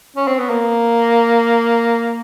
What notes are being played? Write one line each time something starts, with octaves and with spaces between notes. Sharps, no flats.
C#4
C4
B3
A#3